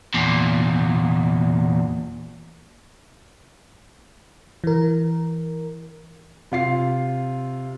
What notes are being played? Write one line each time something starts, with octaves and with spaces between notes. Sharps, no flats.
E2 A#2
E3 A#4
C3 F4 C7